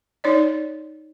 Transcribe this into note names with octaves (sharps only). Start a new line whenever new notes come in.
D#4 C#5 D5